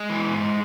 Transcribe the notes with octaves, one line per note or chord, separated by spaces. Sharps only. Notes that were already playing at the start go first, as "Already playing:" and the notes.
Already playing: G#3
E3
G#2